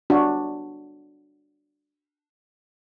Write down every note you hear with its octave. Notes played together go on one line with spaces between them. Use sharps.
D4 F#4